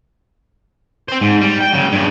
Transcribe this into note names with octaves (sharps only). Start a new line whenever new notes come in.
C4 C5
G#2
G3
G5
C#3 F#3
G2 C#3